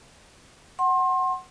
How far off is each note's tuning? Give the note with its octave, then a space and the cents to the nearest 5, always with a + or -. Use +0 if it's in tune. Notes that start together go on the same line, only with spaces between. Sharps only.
F#5 +10 C6 +30